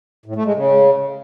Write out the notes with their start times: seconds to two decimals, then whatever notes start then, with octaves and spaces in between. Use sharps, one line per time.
0.26 A2
0.36 A3
0.45 G#3
0.55 C#3